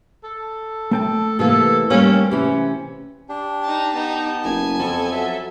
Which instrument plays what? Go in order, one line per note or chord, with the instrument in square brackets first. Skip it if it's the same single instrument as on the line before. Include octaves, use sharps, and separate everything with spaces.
[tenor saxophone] A4
[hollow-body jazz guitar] A3 G5 A5
[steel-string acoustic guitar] C3 E3 A#3 [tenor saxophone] A4
[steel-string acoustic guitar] G3 A#3 C4 [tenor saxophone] C#4
[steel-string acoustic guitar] C3 C#4 [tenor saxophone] E3
[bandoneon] D4 [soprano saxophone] G4
[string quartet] D#4 A5
[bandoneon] B3 A5 [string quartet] D#4
[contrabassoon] F#1 [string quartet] G#5
[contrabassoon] F2 [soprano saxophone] A4
[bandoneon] F#3 E5